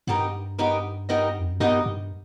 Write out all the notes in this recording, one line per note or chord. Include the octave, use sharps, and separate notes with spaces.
G2 B3 D#4 G4 A#4 D#5
B3 D#4 G4 A#4 D#5
B3 D#4 G4 A#4 D#5
F2
F#2
G2 B3 D#4 G4 A#4 D#5
G2